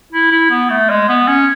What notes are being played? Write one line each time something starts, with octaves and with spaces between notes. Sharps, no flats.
E4
E4
B3
A3
G#3
B3
C#4